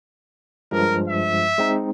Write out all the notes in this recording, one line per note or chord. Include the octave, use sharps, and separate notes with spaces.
G2 F3 G#3 A#4
E5
G#3 C4 D#4